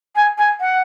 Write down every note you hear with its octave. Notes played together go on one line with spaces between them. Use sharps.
G#5
G#5
F#5